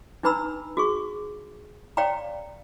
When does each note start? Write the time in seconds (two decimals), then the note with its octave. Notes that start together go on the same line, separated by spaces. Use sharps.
0.23 D4 D#4 B4 A#5 B5 E6
0.77 F#4 G#4 C#6
1.97 C#5 D5 F5 G5 A#5